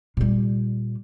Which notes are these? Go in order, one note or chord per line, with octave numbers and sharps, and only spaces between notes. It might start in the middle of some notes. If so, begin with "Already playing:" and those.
A#2 G3